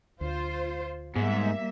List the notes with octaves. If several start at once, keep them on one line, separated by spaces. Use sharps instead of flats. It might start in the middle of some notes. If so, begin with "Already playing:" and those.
D2 F4 C5
G#2 G3 A#3 B3 E5